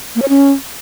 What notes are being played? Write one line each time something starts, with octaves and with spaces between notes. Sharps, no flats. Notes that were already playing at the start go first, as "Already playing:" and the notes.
A#3
C#5
C#4